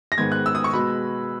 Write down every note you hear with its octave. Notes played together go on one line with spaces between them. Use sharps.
A#6
G#2 D#3 G#3 B3 G#6
F#6
E6
D#6
C#6
B2 G#3 B3 B5